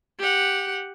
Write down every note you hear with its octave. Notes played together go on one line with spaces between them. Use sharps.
G4 F#5